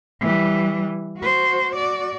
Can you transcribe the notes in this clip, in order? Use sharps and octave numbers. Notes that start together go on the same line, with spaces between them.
E3 G3
F#4 C5
F#4 D5